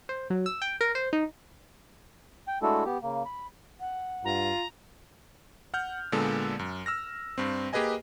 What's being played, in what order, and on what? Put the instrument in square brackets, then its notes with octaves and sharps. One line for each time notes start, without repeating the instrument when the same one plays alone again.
[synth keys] C5
F#3
E6
G5
A#4
C5
D#4
[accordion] G5
G#3 A3 D4 E4 F#4 A4
B3 G4
C#3 A#3
B5
[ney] F#5
[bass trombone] G2 [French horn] F4 [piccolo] A#5
[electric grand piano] F#5 F6 G6
A#2 D3 G#3 B3 A4
F#2
E6 F6 A#6
G2 C4
A#3 G4 G#4 B4 D#5 G#5